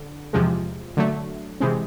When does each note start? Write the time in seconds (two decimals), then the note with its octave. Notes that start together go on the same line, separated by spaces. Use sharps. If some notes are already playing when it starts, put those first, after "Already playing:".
Already playing: D3
0.33 E2 C3 F3 G#3
0.97 D3 F#3 A3
1.60 C3 E3 G#3 C4